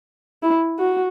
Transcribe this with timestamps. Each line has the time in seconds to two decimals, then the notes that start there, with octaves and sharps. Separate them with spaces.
0.43 E4
0.79 F#4